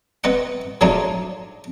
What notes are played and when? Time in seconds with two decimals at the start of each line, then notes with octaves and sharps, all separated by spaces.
0.24 B3 B4 D#5 F#5
0.81 F3 F#3 G#3 A3 D4 D#4